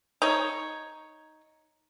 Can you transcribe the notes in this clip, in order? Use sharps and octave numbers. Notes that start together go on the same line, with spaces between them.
D#4 C#5